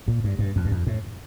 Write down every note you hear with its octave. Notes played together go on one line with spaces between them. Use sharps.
A#2
G2
G2
F2
G2
F2
A2